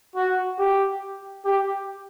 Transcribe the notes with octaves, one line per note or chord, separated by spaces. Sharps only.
F#4
G4
G4